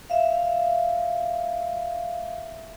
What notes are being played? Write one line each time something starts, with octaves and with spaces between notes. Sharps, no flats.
E5 F5